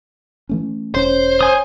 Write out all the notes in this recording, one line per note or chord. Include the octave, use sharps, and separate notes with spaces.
E3 A3 C#4
E1 C#4 C5 C#5
G#5 D#6